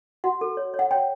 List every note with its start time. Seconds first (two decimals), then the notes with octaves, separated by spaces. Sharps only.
0.24 F#4 F#5
0.41 A4
0.57 C#5
0.74 C#5
0.79 F#5
0.91 C#5 G5